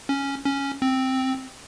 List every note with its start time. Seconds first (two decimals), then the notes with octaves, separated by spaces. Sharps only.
0.09 C#4
0.46 C#4
0.82 C4